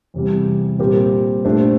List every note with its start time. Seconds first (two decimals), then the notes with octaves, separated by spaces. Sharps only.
0.14 E2 C3 G3
0.79 A#2 G3 C4 G4 A#4
1.45 A#2 A3 D4 G4 C5